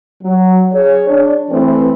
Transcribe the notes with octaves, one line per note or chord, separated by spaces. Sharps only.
F#3
G#4 C#5
D4
E3 A3 C4 B4